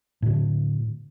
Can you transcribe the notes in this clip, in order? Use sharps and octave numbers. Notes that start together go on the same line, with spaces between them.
A2 D3